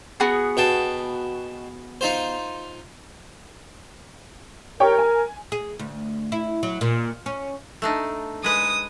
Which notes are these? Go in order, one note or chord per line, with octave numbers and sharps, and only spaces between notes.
B3 F#4 G#4
B2 G5 A5
D#4 F4 C5
G4 A#4 C#5 G5
G#5
G#4
D2
E4
F#3
A#2
C#4
A3 D4 D#4
G#3 B4 D#6